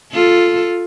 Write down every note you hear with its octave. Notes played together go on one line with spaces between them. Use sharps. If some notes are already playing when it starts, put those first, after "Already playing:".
F4 A4